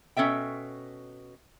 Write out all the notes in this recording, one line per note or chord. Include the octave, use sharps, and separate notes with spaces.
B2 C#4 A4 E5 G5